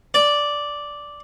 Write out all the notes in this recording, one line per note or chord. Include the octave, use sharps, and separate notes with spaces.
D5